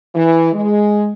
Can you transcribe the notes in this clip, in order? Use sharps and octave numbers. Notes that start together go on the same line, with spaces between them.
E3
G#3